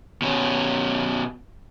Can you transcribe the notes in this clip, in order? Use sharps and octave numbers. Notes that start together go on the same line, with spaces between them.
B2 C#4